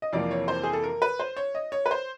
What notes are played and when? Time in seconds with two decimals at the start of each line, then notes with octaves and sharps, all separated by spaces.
0.02 D#5
0.13 F2 C3 E3 G3 A#3 D5
0.31 C#5
0.48 C5
0.63 G#4
0.73 A4
0.84 A#4
1.02 B4
1.20 C5
1.36 C#5
1.55 D#5
1.72 C#5
1.86 B4
1.91 C5